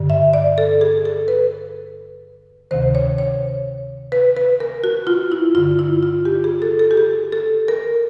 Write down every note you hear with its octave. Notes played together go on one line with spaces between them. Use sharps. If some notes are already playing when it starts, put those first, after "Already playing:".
Already playing: G2 D3
E5
D5
A4
G#4
A4
B4
D2 C3 D#3 C5
C#5
C#5
B4
B4
A#4
F#4
F4
E4
G2 D3 F4
E4
F4
G4
G#4
A4
A4
G4
G#4
A4
A#4